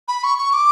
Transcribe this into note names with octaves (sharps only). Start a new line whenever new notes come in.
B5
C#6
C#6
D6